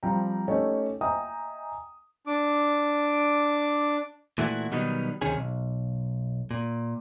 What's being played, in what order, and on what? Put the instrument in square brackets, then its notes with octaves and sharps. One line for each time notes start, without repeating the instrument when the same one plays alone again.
[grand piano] F3 G3 C4 G5 A#5
A3 C#4 D#4 G4 A4
D#5 E5 G5 G#5 A#5 D#6
[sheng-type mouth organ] D4 D6
[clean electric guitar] A#2 E3 A3 E4 F#4
B2 D#3 F#3 G3 B3 D#4
D2 C3 D#3 C#4 G#4
B1
A#2